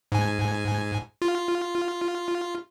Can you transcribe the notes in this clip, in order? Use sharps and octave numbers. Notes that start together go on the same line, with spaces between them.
G#2 G#5
F4